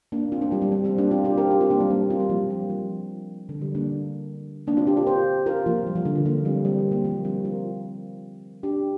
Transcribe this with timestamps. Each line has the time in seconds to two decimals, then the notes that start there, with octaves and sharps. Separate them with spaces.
0.12 A#3 D4
0.32 C4 F4
0.41 A#3 D4
0.51 G3 C4
0.62 G3 C4
0.72 G3 C4
0.84 G3 C4
0.98 A#3 D4
1.11 C4 F4
1.24 D4 G4
1.37 F4 A#4
1.51 D4 G4
1.61 C4 F4
1.70 A#3 D4
1.80 G3 C4
1.90 A#3 D4
2.10 C4 F4
2.20 G3 C4
2.29 F3 A#3
2.50 G3
2.70 F3
3.49 D3
3.62 G3
3.75 A#3 D4
4.67 A#3 D4
4.77 C4 F4
4.87 D4 G4
4.97 F4 A#4
5.07 G4 C5
5.46 F4 A#4
5.66 F3 A#3
5.87 G3
5.95 F3
6.05 D3
6.15 F3
6.25 F3 A#3
6.45 G3 C4
6.65 G3 C4
6.79 G3
6.91 F3 A#3
7.04 F3 A#3
7.25 G3 C4
7.45 F4 A#4
8.63 D4 G4